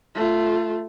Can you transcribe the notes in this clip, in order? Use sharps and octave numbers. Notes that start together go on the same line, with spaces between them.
A3 F4